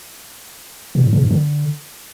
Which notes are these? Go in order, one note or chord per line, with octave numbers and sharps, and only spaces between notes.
B2
G#2
C#3
G2
D3